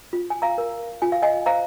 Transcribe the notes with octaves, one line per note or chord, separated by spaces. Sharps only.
F4
G#5
F5 A#5
A#4
F4 G#5
F5
D#5 G#5
C5 F5 A#5